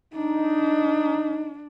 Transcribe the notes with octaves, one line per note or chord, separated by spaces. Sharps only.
D4 D#4